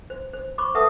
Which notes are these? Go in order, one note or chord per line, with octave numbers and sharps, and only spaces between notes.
C5
C5
C5 B5 C#6 D6
A4 B4 E5 F#5 A5 D#6